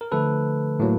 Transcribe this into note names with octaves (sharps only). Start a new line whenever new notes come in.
A#4
D3 F3 A3 A4 B4
A2 F#3 A#3